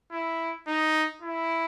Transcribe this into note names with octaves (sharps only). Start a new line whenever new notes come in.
E4
D#4
E4